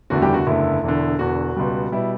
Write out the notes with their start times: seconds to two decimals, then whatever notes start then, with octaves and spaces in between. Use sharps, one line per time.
0.10 F#1 E2 D3 A3 F#4
0.22 G3 G4
0.34 F#4
0.47 F#1 E2 D3 A3 E4
0.83 E1 E2 D3
1.19 E1 E2 D3 F#4
1.57 C#2 B2 G3
1.92 B2 G3 E4